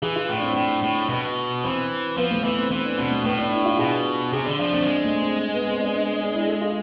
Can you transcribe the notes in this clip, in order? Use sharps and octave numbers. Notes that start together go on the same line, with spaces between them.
E3 G#4
F4
A2
D4
C4
A2
A2
B2
E3 C4
F3 B3
A3
E3 B3
C4
E3 C4
D4
B2 C4
A3
A2 B3
D4
E4
F4
B2 G#4
C3 G#4
D3 D4
F3 D4
A3 C4
F3
G#3
A3
C4
B3
C4
D4
D4
D4
E4
A4
F4